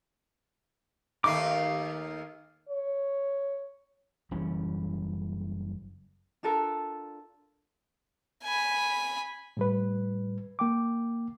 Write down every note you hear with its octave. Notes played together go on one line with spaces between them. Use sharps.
D#2 A3 D#4 F5 D6
C#5
F#1 E3 G3 C#4
D4 F4 A4 A#4
G#5 B5
A2 G3 B4
A#3 G5 D6